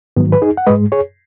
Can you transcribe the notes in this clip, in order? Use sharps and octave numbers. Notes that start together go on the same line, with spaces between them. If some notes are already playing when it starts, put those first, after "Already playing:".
G#2 D#3 F#3 B3
B4
D#4 G#4
F#5
G#2 G#3 B4 D#5
G#4 C#5